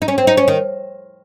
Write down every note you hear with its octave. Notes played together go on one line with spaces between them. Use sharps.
D#4
C#4
C4
D#4
C#4
D#3